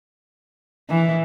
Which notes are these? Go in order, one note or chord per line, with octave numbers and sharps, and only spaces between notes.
E3